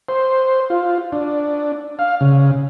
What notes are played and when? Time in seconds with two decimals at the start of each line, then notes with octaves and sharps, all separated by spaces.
0.09 C5
0.70 F4
1.12 D4
1.99 F5
2.21 C#3